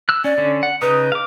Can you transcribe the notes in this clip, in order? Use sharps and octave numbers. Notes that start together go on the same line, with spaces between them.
E6 F#6
C#4 D5
D3 C#4
F#5
C#3 D#4 B4 D#6
F5 D6